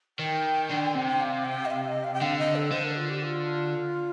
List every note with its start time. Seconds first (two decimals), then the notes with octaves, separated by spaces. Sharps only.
0.19 D#3 G5
0.70 D3
0.95 C3
1.08 G5
1.21 F5
1.45 G5
1.65 D#5
1.71 F5
1.88 D#5
2.04 F5
2.14 G5
2.22 D3 F5
2.39 D#5
2.55 A4
2.72 D3 C5
2.84 A#4
2.97 F4
3.09 G4
3.22 F4